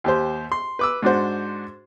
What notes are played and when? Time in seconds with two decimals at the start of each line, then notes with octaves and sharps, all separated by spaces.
0.04 D#2 G4 C5
0.52 C6
0.79 B4 D6 E6
1.02 G#2 D4 F#4 C5